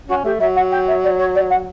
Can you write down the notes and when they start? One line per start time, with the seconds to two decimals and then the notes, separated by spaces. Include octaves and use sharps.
0.08 C#4 F#4
0.24 A3 G4
0.40 F#3 E5
0.55 F#5
0.71 G5
0.87 E5
1.03 D5
1.18 C#5
1.34 D5
1.49 F#5